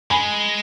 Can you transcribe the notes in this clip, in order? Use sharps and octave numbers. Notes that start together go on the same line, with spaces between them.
G#3 G#5 B5